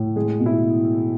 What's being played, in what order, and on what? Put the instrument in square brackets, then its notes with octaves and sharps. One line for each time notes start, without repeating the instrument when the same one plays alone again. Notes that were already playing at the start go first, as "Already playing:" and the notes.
Already playing: [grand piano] A2
G#3 G#4
B2
E4